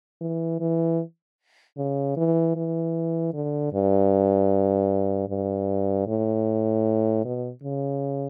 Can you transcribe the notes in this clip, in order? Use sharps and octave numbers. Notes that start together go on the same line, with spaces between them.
E3
E3
C#3
E3
E3
D3
G2
G2
A2
B2
C#3